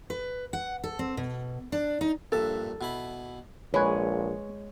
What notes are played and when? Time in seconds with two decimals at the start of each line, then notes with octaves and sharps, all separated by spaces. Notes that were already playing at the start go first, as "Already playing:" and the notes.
0.10 B4
0.53 F#5
0.84 A4
0.99 C4
1.17 B2
1.72 D4
2.01 D#4
2.32 A#1 G2 A4 E5
2.81 B2 E4 B5
3.74 A#1 G#3 B4 C#5 G#5